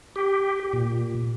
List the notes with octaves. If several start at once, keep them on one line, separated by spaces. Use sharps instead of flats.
G4
A#2